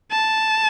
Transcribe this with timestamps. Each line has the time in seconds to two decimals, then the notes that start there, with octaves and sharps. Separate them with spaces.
0.12 A5